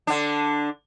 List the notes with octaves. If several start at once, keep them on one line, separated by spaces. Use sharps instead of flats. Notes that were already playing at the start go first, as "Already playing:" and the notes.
D3 D4